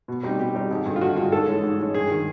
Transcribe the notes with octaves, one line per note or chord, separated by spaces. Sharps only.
B2
G3 C4 D#4
B2 G4
G3 C4 D#4
G#1
G2 D3
F4
G#1 F#4
G2 D3 F4
G#2 A4
E3 G#3 C#4
G#2
E3 G#3 C#4
G2 G#4
D#3 G#3